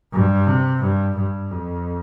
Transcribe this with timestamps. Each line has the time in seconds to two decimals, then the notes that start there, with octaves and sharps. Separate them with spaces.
0.13 G2
0.47 C3
0.82 G2
1.17 G2
1.51 F2